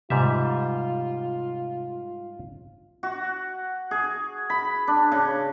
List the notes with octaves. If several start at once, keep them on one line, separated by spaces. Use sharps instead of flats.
G#2 C3 G3 F4 E5
F#4
G#4
B5
D4
C#3